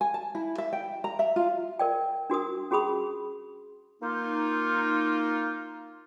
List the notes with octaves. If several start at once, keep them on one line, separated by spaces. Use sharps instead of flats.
G#5
A5
E4
E5
G5
A#5
E5
F4
A#4 D5 G5
D4 F#4 A#4 D#6
C#4 F#4 G#4 B5 D#6
A#3 D#4 F4